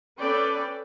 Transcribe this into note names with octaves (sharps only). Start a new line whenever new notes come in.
C#4 A4 B4 D5 G5